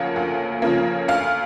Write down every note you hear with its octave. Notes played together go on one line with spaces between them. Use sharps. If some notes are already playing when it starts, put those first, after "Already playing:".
Already playing: D2 C#3 F3 A#3 F#5
D2
C#3 F3 A#3
D2 F5